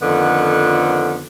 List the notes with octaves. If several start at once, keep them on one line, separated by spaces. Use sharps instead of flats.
F2 D3 D#3 F3 B3